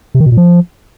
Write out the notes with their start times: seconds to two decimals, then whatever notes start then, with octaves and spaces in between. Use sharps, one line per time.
0.15 C3
0.20 D#3
0.26 B2
0.32 A#2
0.37 F3